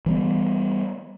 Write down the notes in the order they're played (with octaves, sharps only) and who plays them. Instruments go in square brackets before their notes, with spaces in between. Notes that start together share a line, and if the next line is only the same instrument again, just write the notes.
[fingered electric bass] E3 G3 B3